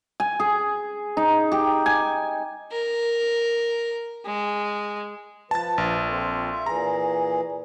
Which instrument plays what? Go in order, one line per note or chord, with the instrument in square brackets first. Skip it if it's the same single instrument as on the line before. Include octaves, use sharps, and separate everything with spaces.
[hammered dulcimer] G#5
G#4
D#4
G4
G#5
[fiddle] A#4
G#3
[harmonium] F3 B4 [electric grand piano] A5 A6
[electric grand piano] A#1
[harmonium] C4 F4 A4
F4 E5
[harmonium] A#2 E3 G#4 [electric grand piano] A#5